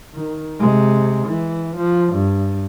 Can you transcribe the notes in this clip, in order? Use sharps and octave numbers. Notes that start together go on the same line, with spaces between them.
D#3
C3 G#3
E3
F3
G2